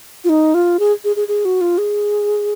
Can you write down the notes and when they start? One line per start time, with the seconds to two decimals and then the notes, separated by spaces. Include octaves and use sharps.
0.24 F4
0.29 D#4
0.54 F4
0.79 G#4
1.04 G#4
1.16 G#4
1.28 G#4
1.45 F#4
1.61 F4
1.78 G#4